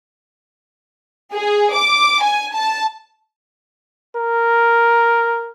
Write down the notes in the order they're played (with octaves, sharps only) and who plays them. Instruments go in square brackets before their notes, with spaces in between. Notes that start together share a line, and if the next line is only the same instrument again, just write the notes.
[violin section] G#4
D6
G#5
A5
[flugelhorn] A#4